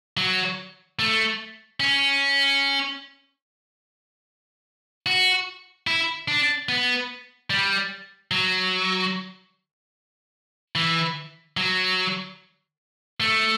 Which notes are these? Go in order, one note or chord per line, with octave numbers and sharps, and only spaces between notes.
F#3
A3
C#4
F#4
E4
D4
B3
G3
F#3
E3
F#3
A3